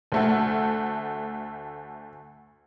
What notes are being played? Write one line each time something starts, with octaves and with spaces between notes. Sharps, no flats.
D2 A3 F#5